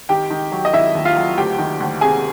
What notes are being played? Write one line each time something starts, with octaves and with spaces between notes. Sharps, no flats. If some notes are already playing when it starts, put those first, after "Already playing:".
D#3 G4 G5
D#3
F#3
D#5
D#3 E4 E5
D#2
F4 F5
F#3
D2 G4 G5
D#3
D2
C3 G#4 G#5